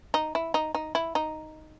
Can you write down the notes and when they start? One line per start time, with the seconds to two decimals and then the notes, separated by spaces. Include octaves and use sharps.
0.14 D#4
0.35 E4
0.54 D#4
0.75 D#4
0.95 E4
1.15 D#4